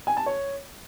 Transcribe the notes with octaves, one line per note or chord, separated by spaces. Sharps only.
G#5
A5
C#5